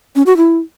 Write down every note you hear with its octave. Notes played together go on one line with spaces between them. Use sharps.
C#4
F#4
E4